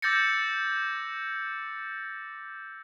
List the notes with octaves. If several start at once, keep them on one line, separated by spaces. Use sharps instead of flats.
D6 E6 G6 A6 A#6 C#7